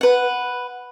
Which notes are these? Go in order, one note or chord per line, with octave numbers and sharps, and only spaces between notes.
B4 F#5